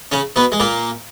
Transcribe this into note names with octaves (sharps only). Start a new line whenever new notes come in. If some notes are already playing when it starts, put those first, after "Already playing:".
C#3 C#4
B2 B3
G#3
A#2 A#3